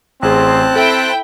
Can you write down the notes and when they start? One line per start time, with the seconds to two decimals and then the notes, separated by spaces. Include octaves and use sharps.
0.23 A1 C4 G#4 C5 A5 F#6
0.76 E4 A4 G5